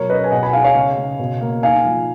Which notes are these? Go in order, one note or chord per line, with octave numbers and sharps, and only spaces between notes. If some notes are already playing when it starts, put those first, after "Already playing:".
Already playing: B2 F#3 A#4 C#5
C#4 B4 D#5
G#5
B2 D#5 F#5
G#5 B5
D#4 F5 G#5
C#5 F5
C#3
C#3
B2
A#3
D#4 F5 G#5
F3